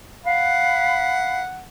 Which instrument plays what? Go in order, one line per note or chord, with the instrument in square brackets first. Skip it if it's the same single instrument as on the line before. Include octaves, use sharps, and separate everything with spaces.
[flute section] F5 B5 [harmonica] F#5